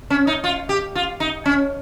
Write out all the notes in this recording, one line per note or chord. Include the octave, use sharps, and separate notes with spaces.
C#4
D#4
F4
G4
F4
D#4
C#4